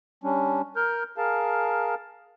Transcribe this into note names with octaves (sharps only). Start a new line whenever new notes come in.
G3 C#4 D4
A#4 F6 G6
G#4 A#4 F5 A5